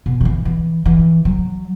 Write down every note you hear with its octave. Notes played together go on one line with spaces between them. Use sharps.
B2
D#3
E3
E3
E3
F#3